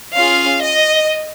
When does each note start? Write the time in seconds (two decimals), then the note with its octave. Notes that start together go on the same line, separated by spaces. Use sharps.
0.14 C#4 F4 G#4 F5
0.61 D#5